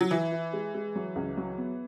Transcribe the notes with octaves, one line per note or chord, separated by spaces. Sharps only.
F#3
E3 E4
E4
G#3
G#3
F#3
C#2
F#3
B3